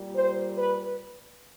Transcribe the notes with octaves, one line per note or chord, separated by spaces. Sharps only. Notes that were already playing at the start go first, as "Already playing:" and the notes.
Already playing: A#2 G3
C5
B4